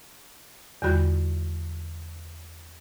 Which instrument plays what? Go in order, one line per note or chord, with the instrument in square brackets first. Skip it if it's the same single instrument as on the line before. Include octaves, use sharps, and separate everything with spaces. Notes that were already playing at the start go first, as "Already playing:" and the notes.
[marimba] E2 D3 G3 F4 F#4 B5